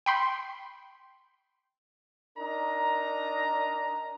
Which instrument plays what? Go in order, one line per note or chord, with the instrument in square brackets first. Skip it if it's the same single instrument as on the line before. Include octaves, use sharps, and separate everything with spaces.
[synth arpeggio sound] G5 B5 C6
[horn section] D4 D#4 A#4 A#5